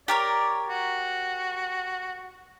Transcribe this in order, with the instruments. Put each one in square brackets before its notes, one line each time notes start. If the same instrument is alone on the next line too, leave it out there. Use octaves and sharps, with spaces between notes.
[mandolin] G4 A#4 C#5 [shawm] D5
[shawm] F#4